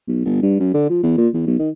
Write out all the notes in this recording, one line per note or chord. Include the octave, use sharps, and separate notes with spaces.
B1
G1
G2
F#2
D3
F3
E2
A#2
E2
B1
D#3